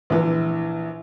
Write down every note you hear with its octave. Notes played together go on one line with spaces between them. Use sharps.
A#1 E3